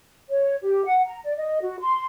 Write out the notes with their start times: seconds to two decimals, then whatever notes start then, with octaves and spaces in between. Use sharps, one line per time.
0.30 C#5
0.62 G4
0.84 F#5
1.06 A#5
1.24 D5
1.37 D#5
1.61 F#4
1.79 C6